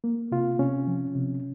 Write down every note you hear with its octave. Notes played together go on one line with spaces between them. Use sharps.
A#3
C3 F4
C3 C#4
F3
C3